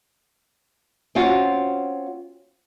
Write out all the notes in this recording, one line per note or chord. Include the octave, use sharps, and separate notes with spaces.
C4 C#4 F4 F#4